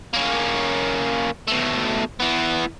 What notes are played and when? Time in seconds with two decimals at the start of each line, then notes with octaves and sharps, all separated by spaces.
0.13 A#3 C#4
1.48 B2 A3
2.20 E3 B3